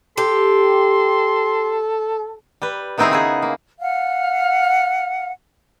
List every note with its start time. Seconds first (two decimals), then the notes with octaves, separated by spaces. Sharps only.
0.18 G4 A4 C6
2.62 G3 B4
2.98 D#3 B3 C4 D#4 E4 G#4
3.11 C#3 F#4 G#4
3.42 A#3
3.80 F5 F#5